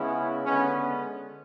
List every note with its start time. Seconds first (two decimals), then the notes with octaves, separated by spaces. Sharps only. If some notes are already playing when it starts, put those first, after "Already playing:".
Already playing: C#3 G#3 B3 C#4 E4
0.45 D3 G#3 B3 C#4